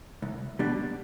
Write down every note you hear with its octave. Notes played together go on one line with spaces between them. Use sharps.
C2
B2 G3 D4